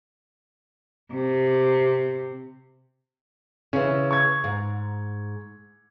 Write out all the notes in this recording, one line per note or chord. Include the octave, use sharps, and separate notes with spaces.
C3
C#3 E3 C#4
C#6 G#6
G#2